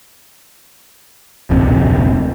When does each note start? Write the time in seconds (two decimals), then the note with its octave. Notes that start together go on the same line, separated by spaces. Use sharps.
1.50 D1 A#1 F2 C3